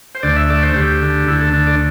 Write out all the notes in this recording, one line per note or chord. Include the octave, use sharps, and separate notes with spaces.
C5
D2 D5
E5
A3 D5
C5
D2 G4
D3
D2 E4
A4
D3 A4
D5